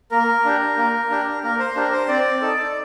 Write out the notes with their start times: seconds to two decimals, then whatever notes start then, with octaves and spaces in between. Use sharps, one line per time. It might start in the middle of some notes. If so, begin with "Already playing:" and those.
0.11 A#3 A#4
0.45 D4 G4
0.77 A#3
1.10 D4 G4
1.43 A#3 A#4
1.59 C5
1.76 D4 G4 A#4
1.92 C5
2.08 C4 D5
2.41 D#4 A4